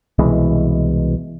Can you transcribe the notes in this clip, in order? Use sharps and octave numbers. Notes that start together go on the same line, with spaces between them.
C2 B2 E3 G#3